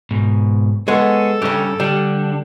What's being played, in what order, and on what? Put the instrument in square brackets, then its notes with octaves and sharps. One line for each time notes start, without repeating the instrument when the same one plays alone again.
[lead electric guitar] G#2 B2
[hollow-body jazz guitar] G#3 B3 [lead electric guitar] G#4 C#5 [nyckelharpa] A4
[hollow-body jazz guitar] G2 C#3 [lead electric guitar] C#4 G4
[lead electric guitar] D3 D4 [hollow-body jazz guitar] G3